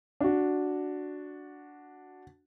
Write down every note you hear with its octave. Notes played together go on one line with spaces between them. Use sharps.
D4 F#4